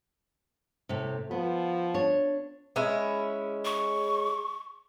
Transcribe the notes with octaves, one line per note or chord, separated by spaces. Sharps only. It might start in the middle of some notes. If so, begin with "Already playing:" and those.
A2 C3
F3 B3
D4 C#5
G#3 C#4 E4
C#6